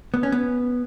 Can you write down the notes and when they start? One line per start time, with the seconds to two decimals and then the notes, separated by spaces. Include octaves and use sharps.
0.14 B3
0.23 C#4
0.32 B3